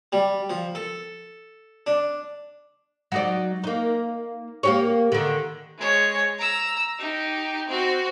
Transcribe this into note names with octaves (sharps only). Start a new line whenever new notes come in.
G3
F3
A4
D4
F#3 D#4 D5
A#3 D#4
A#3 G4 C#5
D3 D#3
G#3 C#5
A#5 E6
D#4 G4
C4 F#4